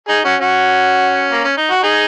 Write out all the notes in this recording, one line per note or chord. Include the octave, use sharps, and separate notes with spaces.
D#4 G#4
C#4 F#4
C#4 F#4
A#3
C#4
D#4
F#4
D#4 G#4